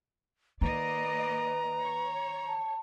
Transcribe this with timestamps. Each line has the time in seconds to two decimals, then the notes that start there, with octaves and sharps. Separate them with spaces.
0.61 D#3 A#3 B4 D5 D#5 A#5
1.83 C#5
2.47 A5